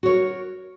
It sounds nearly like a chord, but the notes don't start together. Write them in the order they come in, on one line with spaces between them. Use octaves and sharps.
F#4 C#5 A#4